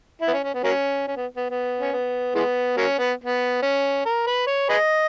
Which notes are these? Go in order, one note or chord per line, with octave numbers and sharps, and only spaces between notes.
E4
B3
C#4
C#4
B3
F#3 A#3 C#4
C#4
B3
B3
B3
C#4
B3
E3 G#3 B3
F#3 A#3 C#4
B3
B3
C#4
A#4
B4
C#5
G#4 B4 D#5